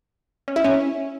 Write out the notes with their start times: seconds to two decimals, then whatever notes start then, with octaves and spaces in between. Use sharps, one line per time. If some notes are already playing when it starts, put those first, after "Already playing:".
0.48 C#4
0.56 E4
0.64 C#4